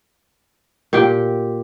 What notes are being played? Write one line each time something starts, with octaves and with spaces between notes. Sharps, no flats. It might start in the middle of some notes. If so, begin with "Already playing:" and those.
A#2 G4 G5